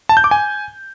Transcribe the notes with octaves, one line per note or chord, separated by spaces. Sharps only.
A5
G6
D6
G#5